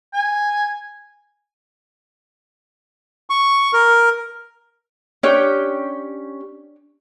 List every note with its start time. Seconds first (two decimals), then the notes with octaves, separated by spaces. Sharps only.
0.13 G#5
3.30 C#6
3.73 A#4
5.23 C#4 D4 G4 C#5 G5